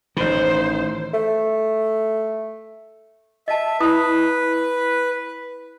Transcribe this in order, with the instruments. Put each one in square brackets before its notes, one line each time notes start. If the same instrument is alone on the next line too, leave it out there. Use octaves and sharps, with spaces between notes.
[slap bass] A1 D#3 [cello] C5
[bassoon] A3
[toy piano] D#5 A5 [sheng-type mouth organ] E5
[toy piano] E4 A#5 D#6 [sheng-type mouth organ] B4